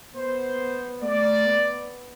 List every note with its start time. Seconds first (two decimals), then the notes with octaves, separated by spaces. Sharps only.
0.14 B3 C5
1.02 A3 D5
1.45 B3